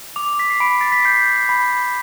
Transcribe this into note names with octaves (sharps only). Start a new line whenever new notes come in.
D6 F7
B6
C7
B5 D7
A6
B6
G6 C7
B5